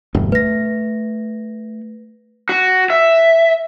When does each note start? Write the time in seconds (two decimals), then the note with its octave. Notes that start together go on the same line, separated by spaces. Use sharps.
0.15 E1 D2 G2
0.32 A3 B4 A#6
2.49 F#4
2.90 E5